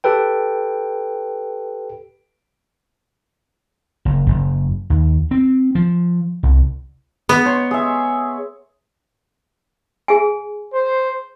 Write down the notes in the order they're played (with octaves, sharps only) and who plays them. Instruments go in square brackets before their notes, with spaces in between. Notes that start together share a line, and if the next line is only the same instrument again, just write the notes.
[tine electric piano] G4 A4 B4 G5
[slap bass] F#1
F#1
D#2
C4
F3
C2
[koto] B3
[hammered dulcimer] C#5 C6
G#4 E5
[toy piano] G#4 G#5
[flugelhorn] C5